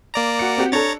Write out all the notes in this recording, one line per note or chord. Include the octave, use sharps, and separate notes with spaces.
A#3 D5 A#5
F#4 C#7
C4 F#4 G4
D4 A4 C#5 A#5 A6